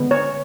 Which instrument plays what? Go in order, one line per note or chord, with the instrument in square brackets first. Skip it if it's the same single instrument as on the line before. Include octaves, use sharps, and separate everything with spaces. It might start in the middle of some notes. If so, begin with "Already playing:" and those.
Already playing: [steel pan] D3 G#3 B3
C#5